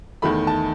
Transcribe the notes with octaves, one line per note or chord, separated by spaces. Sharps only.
E2 D#3 A3 B5
A5